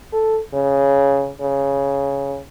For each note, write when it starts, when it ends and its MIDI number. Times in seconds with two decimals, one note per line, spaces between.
0.13 0.39 69
0.54 1.31 49
1.41 2.40 49